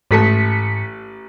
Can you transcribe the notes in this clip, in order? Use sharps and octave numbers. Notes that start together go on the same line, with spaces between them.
A1 G#2 A3 A5 B6 C#7